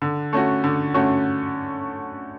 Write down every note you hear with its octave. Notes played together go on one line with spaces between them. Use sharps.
D3
A3 C#4 F#4
D3
A3 C#4 F#4